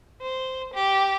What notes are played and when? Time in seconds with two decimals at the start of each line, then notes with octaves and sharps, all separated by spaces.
0.21 C5
0.73 G4